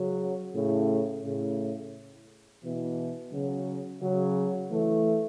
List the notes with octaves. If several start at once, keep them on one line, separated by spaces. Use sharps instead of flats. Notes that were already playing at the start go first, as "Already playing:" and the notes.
Already playing: C#3 F#3
A2 C#3
A2 C#3
B2 E3
C#3 F#3
C#3 F#3
E3 A3